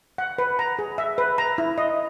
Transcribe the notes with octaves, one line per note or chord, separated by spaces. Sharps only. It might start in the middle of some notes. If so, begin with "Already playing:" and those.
F#5
B4
A#5
G#4
E5
B4
A#5
E4
D#5